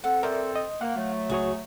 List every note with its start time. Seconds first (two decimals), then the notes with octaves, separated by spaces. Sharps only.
0.04 C4 A4 F#5
0.23 A#4 C5 D5 E5
0.56 D#5
0.81 A#3 F5 F#5
0.96 F#3 A3
1.30 C#2 F#4 G#4 C#5